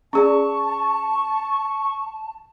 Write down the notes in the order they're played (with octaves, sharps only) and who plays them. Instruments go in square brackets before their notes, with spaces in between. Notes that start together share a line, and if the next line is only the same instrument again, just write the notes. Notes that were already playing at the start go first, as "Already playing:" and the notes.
[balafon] C#4 G#4 D5 [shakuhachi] A5 [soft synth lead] C#6